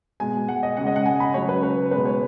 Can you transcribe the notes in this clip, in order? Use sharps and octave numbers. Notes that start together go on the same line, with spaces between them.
B2 G#3 G#5
F#5
D#5
C#3 G#3 F#5
D#5
F#5
G#5
B5
C#3 F#3 C#5
B4
B4
B2 G#3 B4
C#5